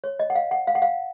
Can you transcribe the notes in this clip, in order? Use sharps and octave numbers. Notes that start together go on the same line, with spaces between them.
C#5
D#5
F#5
F5
F#5
F5
F#5
F5